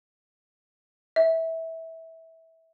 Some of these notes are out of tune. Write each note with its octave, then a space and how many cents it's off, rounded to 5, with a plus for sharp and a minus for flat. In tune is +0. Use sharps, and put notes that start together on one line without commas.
E5 -20